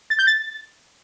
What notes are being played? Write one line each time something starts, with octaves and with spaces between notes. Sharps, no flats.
A6
G6
A6